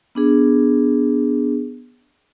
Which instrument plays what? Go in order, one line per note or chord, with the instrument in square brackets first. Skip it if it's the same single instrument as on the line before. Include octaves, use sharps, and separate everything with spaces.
[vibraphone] B3 D4 G#4